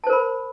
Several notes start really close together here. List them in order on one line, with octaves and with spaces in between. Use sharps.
A5 C5 A#4 B5